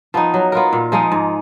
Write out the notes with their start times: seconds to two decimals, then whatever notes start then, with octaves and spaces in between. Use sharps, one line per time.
0.14 F3 B3 D#4
0.34 F#3
0.52 B3 F4 A#4
0.73 A#2
0.92 F3 G#3 D#4
1.12 G#2